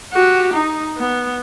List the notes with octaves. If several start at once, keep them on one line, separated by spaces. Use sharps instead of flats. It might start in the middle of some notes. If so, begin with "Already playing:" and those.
F#4 G4
D#4
B3